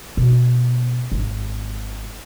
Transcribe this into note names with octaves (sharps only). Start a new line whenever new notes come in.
B2
G#1